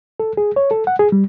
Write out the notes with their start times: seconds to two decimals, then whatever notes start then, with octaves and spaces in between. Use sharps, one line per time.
0.20 A4
0.37 G#4
0.56 C#5
0.71 A4
0.87 F#5
0.99 G#4
1.12 G3